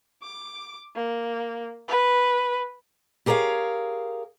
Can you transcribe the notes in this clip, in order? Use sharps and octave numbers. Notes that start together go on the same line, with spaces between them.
D6
A#3
B4
G4 G#4 A#4 B4 C#5 F5